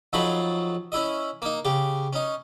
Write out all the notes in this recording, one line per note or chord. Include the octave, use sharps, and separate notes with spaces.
F2 F3 F#3 D#4 C#5 B5
C#4 E4 D#5
A#3 D#4
C#3 G4
C#4 D#4